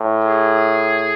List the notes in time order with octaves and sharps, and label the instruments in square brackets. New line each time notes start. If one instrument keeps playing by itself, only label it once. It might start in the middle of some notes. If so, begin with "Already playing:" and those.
Already playing: [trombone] A2
[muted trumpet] G#4